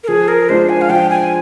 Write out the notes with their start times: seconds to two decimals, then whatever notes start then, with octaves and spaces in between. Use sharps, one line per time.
0.04 A#4
0.08 F3 G#4
0.28 A#4
0.49 G#3 D4 F4 C5
0.69 G#5
0.81 F5
0.90 F3 G5
1.10 G#5